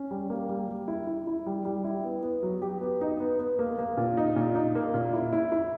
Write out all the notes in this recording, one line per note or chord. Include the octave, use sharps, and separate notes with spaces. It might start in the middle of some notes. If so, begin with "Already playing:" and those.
Already playing: C#4
G3
A#3
G3
G3
E4
E4
E4
G3
G3
E4
B3
B3
F#3
G4
B3
D#4
B3
B3
A#3
A#3
A#2
D#4
A#2
D#4
A#3
A#2
E4
E4
E4